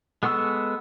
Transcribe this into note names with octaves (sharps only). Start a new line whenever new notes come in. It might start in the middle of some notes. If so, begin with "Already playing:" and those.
G#3 B3 A4 C#6 E6